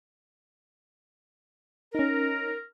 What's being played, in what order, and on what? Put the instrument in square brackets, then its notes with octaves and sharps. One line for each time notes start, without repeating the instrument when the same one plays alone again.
[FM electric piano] C#4 D#4 [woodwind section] A#4